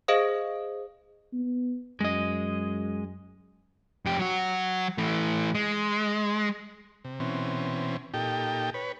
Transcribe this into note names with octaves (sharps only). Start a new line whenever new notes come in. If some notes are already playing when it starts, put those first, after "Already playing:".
G#4 C5 D#5 F5 D#6
B3
F#2 G#3 D#5
F2 G4
F#3 F#4
E3 A3
G#3
C3
B2 E3 C4 C#4
A#2 D#4 G4 A4 G5
B4 C#5